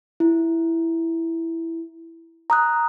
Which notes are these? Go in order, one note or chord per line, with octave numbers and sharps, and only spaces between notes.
E4
A#5 D#6 F#6